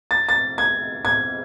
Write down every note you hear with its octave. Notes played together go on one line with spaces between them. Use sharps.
A6
A6
G#6
G#6